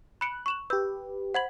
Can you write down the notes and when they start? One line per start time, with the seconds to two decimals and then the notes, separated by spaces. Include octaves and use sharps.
0.21 B5 F#6 C#7 D7
0.46 C#6 E7 F#7
0.70 G4 B4 E6 G6
1.34 C5 F#5 B5 G#6 F#7